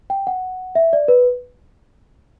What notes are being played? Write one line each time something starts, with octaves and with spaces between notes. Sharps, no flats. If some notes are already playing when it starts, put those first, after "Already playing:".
G5
F#5
E5
D5
B4